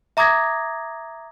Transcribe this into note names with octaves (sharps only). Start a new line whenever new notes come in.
E5 A#5 D6 D#6 G#6 A#6